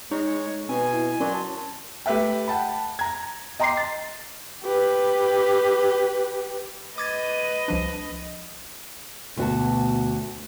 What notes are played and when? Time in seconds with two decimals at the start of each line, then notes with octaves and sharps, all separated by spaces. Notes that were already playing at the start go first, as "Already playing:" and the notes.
0.11 G#3 D#4 C#5
0.48 G#3
0.69 B2 C4 G#5
0.93 E4
1.20 F#3 C#4 A#4 D5 C6
1.34 A5
2.06 A3 G4 B4 E5 G5
2.48 F#5 G5 A5 B5
2.99 A#5 G#6
3.60 D#5 G5 A#5 C6 D6 C7
3.77 A6
4.63 G4 B4
6.98 B4 D#5 D6 G#6 A6
7.68 C2 F3 D4
9.37 D2 B2 F#4 A5